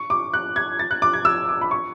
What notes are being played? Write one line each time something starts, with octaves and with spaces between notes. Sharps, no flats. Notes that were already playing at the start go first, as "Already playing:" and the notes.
Already playing: C#6
D6
F#6
G#6
A6
F#6
D6
G#6
E6
D6
B5
C#6